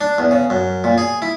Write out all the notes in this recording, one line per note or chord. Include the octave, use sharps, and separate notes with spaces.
D4
E2
C#3
F#2
A#2
G#4
E4